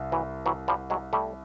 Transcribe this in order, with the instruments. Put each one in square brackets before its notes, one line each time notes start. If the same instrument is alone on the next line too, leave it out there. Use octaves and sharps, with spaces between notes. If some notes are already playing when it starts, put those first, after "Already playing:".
Already playing: [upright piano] C2
[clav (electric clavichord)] E3 F#3
E3 F#3
F3 G3
F#3 G#3
G3 A3